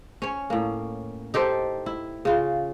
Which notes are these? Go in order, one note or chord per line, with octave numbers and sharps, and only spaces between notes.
C#4 C#5
A2 A#3
D#4 G4 A4 C5
E4
C#3 F4